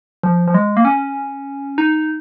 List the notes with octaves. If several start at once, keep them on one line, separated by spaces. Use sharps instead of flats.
F3
F3
G#3
A#3
C#4
D#4